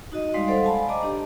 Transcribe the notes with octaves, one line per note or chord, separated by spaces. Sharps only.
D#4 F#4 D#5
G3 G#3 D#4 D5 F5 C6
A4 C5 D5 F5 F#5
F5 G#5 A5 B5
D5 D#5 A#5 D6
D4 G4